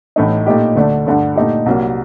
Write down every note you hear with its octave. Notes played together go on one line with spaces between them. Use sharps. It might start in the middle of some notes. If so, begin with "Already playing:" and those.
A1 A2 A3 D#4
A#2 A3 D#4 G4
D2 D3 A3 D4
G2 D3 A3
A#2 A3 D#4 G4
C2 C3 F#3 A#3